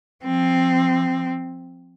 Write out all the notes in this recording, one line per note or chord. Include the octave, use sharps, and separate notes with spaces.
F3 C4